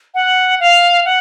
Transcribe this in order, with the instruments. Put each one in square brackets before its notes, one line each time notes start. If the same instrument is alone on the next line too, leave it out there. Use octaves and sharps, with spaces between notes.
[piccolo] F#5
F5
F#5